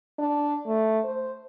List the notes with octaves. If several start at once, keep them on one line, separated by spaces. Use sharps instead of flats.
D4
A3
C5